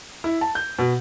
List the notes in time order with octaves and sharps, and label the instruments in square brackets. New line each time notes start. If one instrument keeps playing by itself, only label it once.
[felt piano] E4
A5
G6
B2